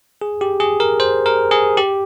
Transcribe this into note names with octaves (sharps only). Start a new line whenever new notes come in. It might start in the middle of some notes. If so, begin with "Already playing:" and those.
G#4
G4
G#4
A#4
C5
A#4
G#4
G4